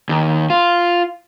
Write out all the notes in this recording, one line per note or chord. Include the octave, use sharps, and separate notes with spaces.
D#2
F4